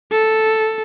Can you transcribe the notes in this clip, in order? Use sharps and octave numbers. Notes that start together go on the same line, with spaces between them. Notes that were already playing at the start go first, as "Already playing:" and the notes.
A4